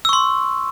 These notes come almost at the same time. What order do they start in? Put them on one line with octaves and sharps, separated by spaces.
E6 C#6 C6